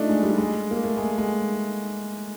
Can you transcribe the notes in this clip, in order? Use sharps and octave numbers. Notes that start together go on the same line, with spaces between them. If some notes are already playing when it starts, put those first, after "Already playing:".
Already playing: A3 D4 D#4 F4
G#3
G3
G#3
A#3
A3
G#3
G#3